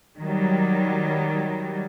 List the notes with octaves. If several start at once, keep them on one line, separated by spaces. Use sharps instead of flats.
D#3 F#3 G3